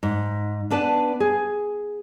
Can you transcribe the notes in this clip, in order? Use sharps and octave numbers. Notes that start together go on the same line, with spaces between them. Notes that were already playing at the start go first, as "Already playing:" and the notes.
G#2
B3 D4 B4 D5 A5
G#4